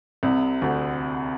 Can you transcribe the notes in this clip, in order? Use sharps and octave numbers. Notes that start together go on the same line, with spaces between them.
C2 C3
D2 D3